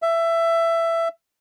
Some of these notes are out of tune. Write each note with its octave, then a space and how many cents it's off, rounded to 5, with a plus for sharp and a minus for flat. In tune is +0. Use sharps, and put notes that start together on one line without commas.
E5 +15